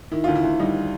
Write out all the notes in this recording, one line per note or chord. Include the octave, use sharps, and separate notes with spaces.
D#3 E4
D2 F4
E4
D2
G3 D#4